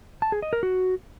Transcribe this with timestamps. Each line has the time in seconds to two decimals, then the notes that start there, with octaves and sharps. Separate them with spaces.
0.22 A5
0.32 G#4
0.42 D#5
0.53 A#4
0.63 F#4